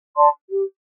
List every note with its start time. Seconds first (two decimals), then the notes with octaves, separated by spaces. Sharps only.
0.16 D5 A5 C6
0.49 G4